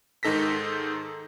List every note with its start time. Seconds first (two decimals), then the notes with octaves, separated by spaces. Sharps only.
0.23 G#2 D#3 D#4 A4 A#6 B6